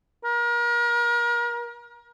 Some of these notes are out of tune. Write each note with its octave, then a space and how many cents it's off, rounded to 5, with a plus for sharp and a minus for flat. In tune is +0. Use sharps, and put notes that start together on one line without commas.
A#4 +35